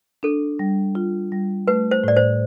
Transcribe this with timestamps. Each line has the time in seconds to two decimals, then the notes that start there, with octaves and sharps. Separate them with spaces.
0.23 D4 A4
0.59 G3
0.95 F4
1.32 G3
1.68 A3 B4
1.91 C5
2.04 A2 D5
2.17 C5